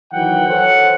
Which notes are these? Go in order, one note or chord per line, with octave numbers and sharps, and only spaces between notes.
D#3 E3 F#3 F#5 G5
A4 C5 C#5 F#5